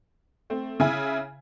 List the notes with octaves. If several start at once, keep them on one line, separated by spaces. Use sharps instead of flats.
A3 C4
C#3 E4 E5 G#5